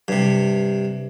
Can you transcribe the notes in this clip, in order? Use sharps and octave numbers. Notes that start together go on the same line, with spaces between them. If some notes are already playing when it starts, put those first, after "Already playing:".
G2 C3